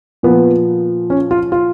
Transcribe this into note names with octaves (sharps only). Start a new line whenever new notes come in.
A#2 F3 B3
C#4
F4
F4